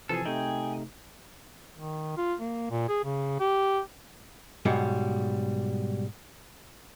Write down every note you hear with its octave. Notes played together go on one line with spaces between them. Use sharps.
C3 E3 F3 G#4 A4
C3 A3 D#4 G#4 G5
D#3
F4
A#3
A#2
G#4
C#3
G4
G#2 B2 F#3 G3